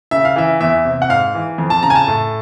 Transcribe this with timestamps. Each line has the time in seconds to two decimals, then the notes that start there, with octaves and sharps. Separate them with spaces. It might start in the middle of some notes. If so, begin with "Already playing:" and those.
0.11 C#3 E5
0.25 F5
0.36 E3 E5
0.60 E2 E5
0.85 C3
1.02 F#5
1.09 G#2 F5
1.35 E3
1.58 F2
1.70 A5
1.83 C#3 A#5
1.90 G#5
1.95 A5
2.08 A2